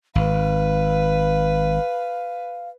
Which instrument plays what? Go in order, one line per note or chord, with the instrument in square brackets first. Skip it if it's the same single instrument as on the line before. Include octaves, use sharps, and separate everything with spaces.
[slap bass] G#1 [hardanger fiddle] B4 [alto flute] F5